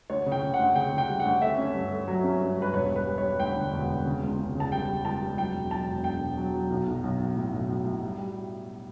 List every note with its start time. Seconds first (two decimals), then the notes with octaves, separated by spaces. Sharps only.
0.10 D2 C#5
0.26 C#3
0.32 G5
0.43 C#3
0.54 F#5
0.59 D2
0.75 C#3 G5
0.92 C#3
0.98 G5
1.09 G3
1.20 F#5
1.25 D2
1.42 A3 E5
1.58 C#4
1.74 G2
1.91 A3
2.08 F#3
2.24 C#4
2.41 G2
2.57 G2 B4
2.74 E1 C#5
2.90 G3
2.96 B4
3.07 G3
3.18 G3 C#5
3.40 D2 G5
3.56 D3
3.73 E1
3.89 E1
4.06 C#3
4.23 C#2
4.39 C#3
4.55 C#3
4.60 A5
4.72 G3 G5
4.88 G3
5.05 C#2 A5
5.22 G3
5.38 F#3 G5
5.54 E1
5.71 F#3 A5
5.88 E1
6.04 E1 G5
6.20 E1
6.37 F#3
6.54 F#3
6.70 B1
6.87 B1
7.03 B1
7.20 B1
7.36 A2
7.52 B1
7.69 B1
7.86 A2
8.02 G3
8.18 G3